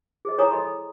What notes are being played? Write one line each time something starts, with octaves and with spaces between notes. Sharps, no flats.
G#4 C5 D#5
E4 C#5 G#5 A#5 D#6
A4 D#5 B5 C6